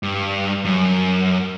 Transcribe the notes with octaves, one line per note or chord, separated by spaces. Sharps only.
G2
F#2